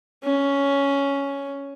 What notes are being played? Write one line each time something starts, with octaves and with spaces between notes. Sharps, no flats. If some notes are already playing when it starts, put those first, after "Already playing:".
C#4